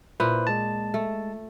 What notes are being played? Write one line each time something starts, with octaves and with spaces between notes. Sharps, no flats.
A#2 E4 B4 C5
G#3 A5
A3